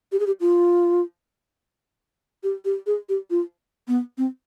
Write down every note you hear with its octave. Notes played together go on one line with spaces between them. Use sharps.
G4
G#4
G4
F4
G4
G4
G#4
G4
F4
B3
C4